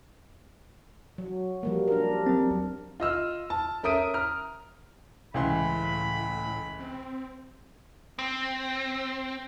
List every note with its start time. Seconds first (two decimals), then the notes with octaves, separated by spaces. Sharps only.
1.18 F#3
1.63 F3 G3 A#3
1.88 D4 A#4
2.27 F#3 C4
3.00 F4 D#5 E6 F6
3.50 A5
3.83 C#4 A#4 E5 D#6 D7 D#7
4.14 A#5 F6
5.34 C#2 A2 E3 B5 C6
6.79 C4
8.19 C4